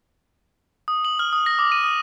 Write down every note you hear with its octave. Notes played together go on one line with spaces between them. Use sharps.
D#6
F#7
F6
D#6
A#6
D6
D#7
D#6